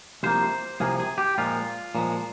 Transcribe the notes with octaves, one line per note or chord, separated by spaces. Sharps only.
C2 C3 F3 A#3 C5
C2 C3 F3 A#3 G#4
G#4
G4
A#2 F3 G#3 F4
A#2 F3 G#3